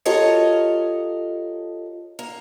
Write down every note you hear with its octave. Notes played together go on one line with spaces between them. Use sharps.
F4 G4 A4 A#4 C#5 D#5
A#3